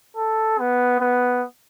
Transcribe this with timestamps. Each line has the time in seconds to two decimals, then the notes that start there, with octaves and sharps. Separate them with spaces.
0.17 A4
0.59 B3
1.00 B3